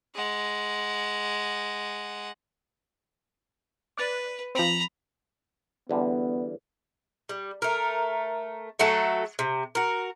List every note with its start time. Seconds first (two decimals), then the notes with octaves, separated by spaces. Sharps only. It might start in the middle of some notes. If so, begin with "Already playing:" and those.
0.15 G#3 F#5
3.97 B4 D5 F#6 A6
4.55 F3 C4 A#5 B5
5.89 E2 D3 G3 B3
7.29 G3
7.62 A3 A#4
8.79 F#3 A3 F#4 A4
9.39 C3
9.75 F#4 A#4